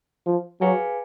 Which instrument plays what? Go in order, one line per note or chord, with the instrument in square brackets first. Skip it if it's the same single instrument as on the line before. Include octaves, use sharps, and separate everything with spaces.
[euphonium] F3
[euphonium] F#3 [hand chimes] G#4 B4 F5 G#5